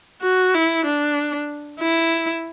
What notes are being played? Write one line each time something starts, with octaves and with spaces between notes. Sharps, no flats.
F#4
E4
D4
E4